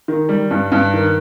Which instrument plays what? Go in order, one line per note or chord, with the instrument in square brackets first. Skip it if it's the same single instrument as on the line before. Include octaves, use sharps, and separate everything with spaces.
[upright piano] D#3
G3
G2
G2
D#3